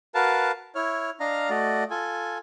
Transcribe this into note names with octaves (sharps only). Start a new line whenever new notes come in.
F#4 A#4 B4 F5 A5
E4 C#5 F6
D4 D#5 F5 A#5 F6
A3 F#4 D5 D#5
F4 A4 G#5